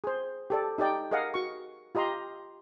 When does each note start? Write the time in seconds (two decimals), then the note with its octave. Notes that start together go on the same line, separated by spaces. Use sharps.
0.04 G#4 C5
0.50 G4 A4 D5
0.78 D#4 G4 D5 G5
1.11 G#4 A#4 D#5 F5 F#5
1.34 F#4 C#6
1.95 F4 G4 D#5 A#5 C6